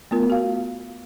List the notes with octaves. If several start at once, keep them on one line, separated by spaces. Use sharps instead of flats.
A3 B3 F4 A#4
F#4 F5